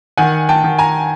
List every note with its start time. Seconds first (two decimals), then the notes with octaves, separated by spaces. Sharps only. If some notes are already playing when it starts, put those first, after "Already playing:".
0.17 D#3 F#5 G#5
0.49 G5 A5
0.64 D#3
0.78 G#5 A#5